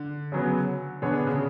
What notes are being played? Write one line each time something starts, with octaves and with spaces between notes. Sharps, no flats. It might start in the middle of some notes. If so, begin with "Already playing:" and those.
Already playing: D3
C#3 F#3 B3
D3 B3 D4 G#4 C#5
C#3